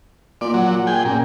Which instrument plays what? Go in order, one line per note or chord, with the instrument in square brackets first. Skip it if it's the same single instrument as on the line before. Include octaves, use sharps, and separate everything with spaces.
[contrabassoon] A#2 [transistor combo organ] D5
[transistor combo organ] F#3
G#4 G5
[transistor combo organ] A#2 [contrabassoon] C#3